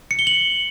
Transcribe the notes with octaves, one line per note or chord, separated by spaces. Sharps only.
C#7
G7
F#7